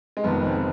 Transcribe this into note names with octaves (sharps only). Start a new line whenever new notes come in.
G#3
F1 F2 D#3 B3
C4